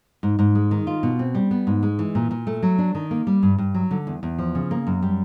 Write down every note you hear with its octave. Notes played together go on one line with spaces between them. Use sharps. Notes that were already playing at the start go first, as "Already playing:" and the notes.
G#2
G#2
G#3
D#3
F4
B2
C4
G3
B3
G#2
G#3
E3
A#2
A#2
A3
F#3
D4
D#3
A#3
G3
G2
G2
F#3
D3
E2
E2
F3
C#3
A#3
F#2
G3